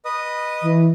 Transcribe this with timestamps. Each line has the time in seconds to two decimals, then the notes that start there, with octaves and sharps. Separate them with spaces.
0.05 B4 D#5 D#6
0.62 E3